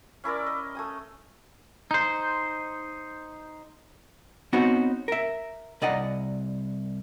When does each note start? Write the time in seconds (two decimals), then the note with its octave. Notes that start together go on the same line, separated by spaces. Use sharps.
0.24 C#4 E4 A#4 D5
0.47 D#5
0.75 A3 G#5 D#6
1.91 D#4 C5
4.53 B3 C4 D#4 F#4 C5 C#5
5.08 A#4 E5
5.82 C2 D5 D#5 F#5 A#5